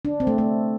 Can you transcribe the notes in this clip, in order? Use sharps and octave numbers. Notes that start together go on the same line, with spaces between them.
D4
C4
A3
A3